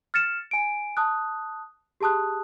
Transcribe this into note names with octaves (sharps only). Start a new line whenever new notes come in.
F6 A6 C#7 E7
G#5 D7
A5 D#6 F#6
G4 G#4 A5 D#6 F#6